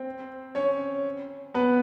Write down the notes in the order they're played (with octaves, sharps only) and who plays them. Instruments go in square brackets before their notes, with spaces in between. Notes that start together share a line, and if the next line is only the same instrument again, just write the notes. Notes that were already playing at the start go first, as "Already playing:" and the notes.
Already playing: [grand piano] C4 C5
C#4 C#5
B3 B4